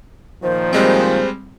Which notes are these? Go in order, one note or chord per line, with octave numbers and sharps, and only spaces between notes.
A#2 D#3 F3 C5
G3 G#3 C4